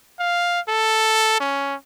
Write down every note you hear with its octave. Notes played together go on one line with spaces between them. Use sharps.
F5
A4
C#4